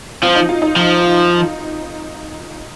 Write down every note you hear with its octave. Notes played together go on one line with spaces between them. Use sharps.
F3 C4
D#4
F4
D#4
F3